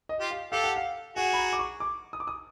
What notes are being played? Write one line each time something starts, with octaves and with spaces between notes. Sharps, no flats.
D#5
F4 G4
F5
G4 A4 F5
F#5
F5
F#4 G#4 F#5
B5
A#5
D6
C#6
D6
D#6
D6
D#6